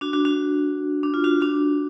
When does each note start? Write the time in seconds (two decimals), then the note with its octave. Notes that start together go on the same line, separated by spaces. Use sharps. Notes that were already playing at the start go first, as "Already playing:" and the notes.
0.01 D4 F#4
0.13 D4 F#4
0.25 D4 F#4
1.03 D4
1.14 F4
1.24 D4 F#4
1.41 D4 F#4